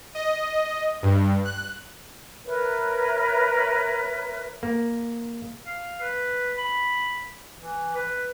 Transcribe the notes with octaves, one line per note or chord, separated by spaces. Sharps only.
D#5
G2
F#6
A#4 B4 C#5 E5
A#3
F5
B4
B5
E3
B4